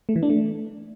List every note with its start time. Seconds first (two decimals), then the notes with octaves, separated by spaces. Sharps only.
0.09 A3
0.16 E3
0.23 D4
0.30 A3